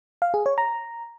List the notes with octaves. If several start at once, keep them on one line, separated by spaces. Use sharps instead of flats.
F5
G#4
C#5
A#5